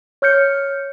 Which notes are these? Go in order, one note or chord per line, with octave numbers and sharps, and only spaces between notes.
C#5 F6 G6 C#7